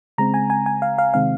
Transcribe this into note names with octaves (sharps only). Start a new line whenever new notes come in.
C#3 G#3 C4 A#5
G#5
G#5
G#5
F5
F5
C3 D#3 G#3 C4 F5